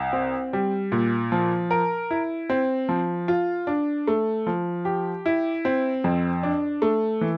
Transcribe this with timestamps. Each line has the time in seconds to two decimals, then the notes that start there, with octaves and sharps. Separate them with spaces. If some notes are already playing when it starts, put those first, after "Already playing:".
Already playing: C2
0.13 C4
0.53 G3
0.92 A#2
1.32 F3
1.71 A#4
2.11 E4
2.50 C4
2.89 F3
3.28 F4
3.67 D4
4.07 A3
4.47 F3
4.85 G4
5.26 E4
5.65 C4
6.04 F2
6.43 D4
6.82 A3
7.21 E3